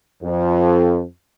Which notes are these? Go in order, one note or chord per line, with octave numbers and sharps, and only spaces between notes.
F2